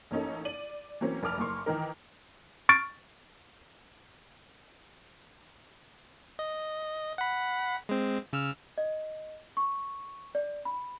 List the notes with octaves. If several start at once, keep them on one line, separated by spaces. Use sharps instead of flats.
A1 A#3 C#4 D#4 A4
D5 D#7 F#7
E3 F#3 A#3 C4 C#4
F1 A#4 A5 D6 F6 F7
F#1 A#3 C6 C#6
D#3 E3 D#4 A#4
C#6 F6 A6 D7
D#5
F#5 B5
G#3 C4
C#3 E6 F6
D#5
C#6
D5
B5